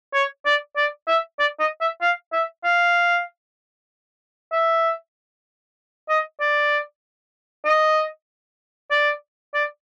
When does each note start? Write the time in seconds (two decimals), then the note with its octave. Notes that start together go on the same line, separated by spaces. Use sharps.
0.14 C#5
0.46 D5
0.76 D5
1.08 E5
1.39 D5
1.60 D#5
1.81 E5
2.02 F5
2.33 E5
2.64 F5
4.52 E5
6.09 D#5
6.40 D5
7.65 D#5
8.91 D5
9.54 D5